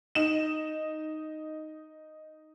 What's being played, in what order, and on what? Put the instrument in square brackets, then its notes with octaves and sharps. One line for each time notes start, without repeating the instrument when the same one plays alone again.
[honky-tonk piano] D#4 E7